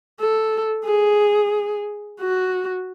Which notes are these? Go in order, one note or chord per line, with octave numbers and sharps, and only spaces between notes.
A4
G#4
F#4